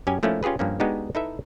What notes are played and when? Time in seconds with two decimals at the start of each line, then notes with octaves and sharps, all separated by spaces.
0.07 F#2 C#4 G4 G#5
0.23 F3 A3 A#3 C#4 D#4 E4
0.43 C#4 F4 G4 G#4 B4
0.59 G2 F3 A#3 C#4
0.80 G#3 B3 D4 D#4 F#4 G4
1.15 D#4 E4 A4 B4 E5